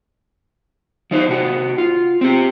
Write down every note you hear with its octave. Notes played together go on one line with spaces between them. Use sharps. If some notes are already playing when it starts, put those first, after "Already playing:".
F3 D#4 C5
C3 F#4
F4
C4 G4